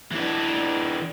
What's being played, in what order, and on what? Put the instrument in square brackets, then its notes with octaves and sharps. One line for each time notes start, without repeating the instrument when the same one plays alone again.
[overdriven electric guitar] E3 D4